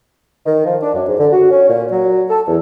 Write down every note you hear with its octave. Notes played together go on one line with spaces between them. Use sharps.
D#3
F3
D4
F#2
G#2
D3
F#4
C#4
A#2
F#3
A4
E2